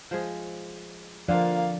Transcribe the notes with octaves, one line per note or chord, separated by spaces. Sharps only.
F3 G#3 G#4
D3 F3 A#3 C4 F4 D5 F5